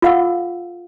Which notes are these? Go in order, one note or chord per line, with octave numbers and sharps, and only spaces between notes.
F4 A4 F5 F#5 C#6 E6